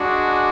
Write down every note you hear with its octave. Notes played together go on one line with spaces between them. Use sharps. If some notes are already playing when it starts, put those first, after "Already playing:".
Already playing: G#3 D4 F#4